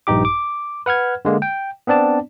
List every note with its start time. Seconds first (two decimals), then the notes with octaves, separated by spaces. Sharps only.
0.07 A#1 G2 D#4 G4 D6
0.25 D6
0.86 B4 F#5 F6 G#6
1.25 D3 G#3 A#3
1.42 G5
1.87 B3 C4 D4 D5 A5